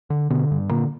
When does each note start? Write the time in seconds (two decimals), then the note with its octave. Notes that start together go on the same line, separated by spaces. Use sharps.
0.10 D3
0.30 B2 D3 B3
0.51 G2
0.70 A#2 D3 A#3